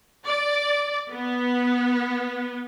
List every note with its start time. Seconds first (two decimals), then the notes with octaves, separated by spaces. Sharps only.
0.24 D5
1.13 B3